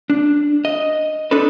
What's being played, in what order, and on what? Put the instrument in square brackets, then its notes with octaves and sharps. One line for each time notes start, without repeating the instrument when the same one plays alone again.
[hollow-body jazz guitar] D4
D#5
D4 D#4 A4 B4